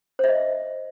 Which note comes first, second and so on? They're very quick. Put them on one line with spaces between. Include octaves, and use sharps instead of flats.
C5 E5 D#5